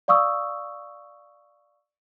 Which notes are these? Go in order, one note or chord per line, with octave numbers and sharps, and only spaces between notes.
D5 F5 C#6 D#6 E6